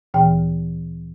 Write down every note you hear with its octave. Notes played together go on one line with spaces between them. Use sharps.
D2 A#2 E3 G5